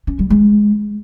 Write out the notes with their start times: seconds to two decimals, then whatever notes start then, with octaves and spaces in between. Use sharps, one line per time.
0.07 C#4
0.19 G3
0.30 G#3